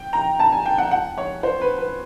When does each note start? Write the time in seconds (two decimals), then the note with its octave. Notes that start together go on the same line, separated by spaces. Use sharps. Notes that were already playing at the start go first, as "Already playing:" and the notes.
Already playing: G5
0.13 A#5
0.39 A5
0.52 G#5
0.66 G5
0.78 F#5
0.91 F#5
1.18 C#5
1.43 C5
1.61 B4
1.78 B4